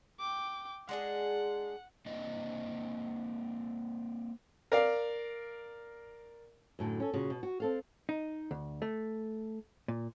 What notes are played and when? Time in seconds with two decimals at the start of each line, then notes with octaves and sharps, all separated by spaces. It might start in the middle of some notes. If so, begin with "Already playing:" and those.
0.20 G5 D6
0.89 G#3 D4 G#4 F#5
2.06 A#3 C4 D4 D#5
4.72 A#4 D5 F5
6.79 F#2 A2 D3
7.00 C#4 A4
7.14 A#2 C#3 F#4
7.30 B2
7.43 F#4
7.60 C4 A4 F5
8.09 D#4
8.51 D2
8.82 A3
9.88 A#2